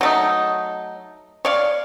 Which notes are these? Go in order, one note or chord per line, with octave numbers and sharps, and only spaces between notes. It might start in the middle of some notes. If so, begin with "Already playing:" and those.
F#3 A3 D#4
C#5 D5 F5